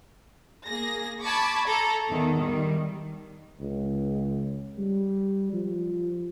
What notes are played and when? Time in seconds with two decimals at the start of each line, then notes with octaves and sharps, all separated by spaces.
0.68 A#3 G#4 A#6
1.22 A5 B5 C#6 D6 G#6 B6
1.66 A4 A#5
2.08 E2 D#3
2.38 D#3 G3
3.60 C#2
4.78 G3
5.53 F3